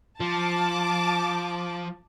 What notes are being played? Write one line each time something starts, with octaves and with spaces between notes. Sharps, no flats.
F3 A5 D6